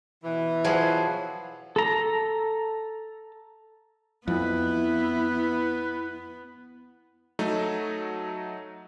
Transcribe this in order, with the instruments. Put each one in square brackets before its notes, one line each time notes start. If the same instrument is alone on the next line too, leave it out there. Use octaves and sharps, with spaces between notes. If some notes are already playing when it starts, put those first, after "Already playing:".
[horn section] B2 E3
[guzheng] F3 F#3 G#4
[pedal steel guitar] A4 A#5
[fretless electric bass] F2 [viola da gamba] B3 [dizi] E4 [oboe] B4
[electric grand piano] F#3 A3 D#4